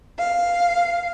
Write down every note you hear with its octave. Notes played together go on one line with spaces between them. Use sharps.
F5